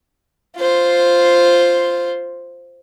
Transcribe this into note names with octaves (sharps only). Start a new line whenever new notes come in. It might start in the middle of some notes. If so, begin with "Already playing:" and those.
F4 C5